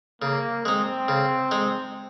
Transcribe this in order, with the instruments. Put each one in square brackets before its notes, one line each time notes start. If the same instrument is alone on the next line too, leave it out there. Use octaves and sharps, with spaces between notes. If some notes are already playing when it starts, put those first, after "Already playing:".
[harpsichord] C#3 [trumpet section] A#3
[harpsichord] G#3 D#4 [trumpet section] C4
[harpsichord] C#3
G#3 D#4